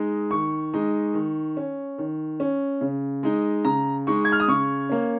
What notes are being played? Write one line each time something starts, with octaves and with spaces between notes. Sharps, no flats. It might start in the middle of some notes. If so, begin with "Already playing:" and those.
Already playing: G#3 D#4
D#3 C#6
G#3 D#4
D#3
C#4
D#3
C#4
C#3
G#3 D#4
C#3 A#5
G#3 D#4 C#6
G#6
F6
D#6
C#3 C#6
A#3 C#4